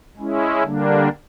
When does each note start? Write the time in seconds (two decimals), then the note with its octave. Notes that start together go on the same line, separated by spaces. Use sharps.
0.17 G#3 C#4 E4
0.63 D3 G3 A#3 D4